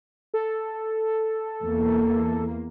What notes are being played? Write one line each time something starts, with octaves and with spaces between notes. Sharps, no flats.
A4
E2 A#3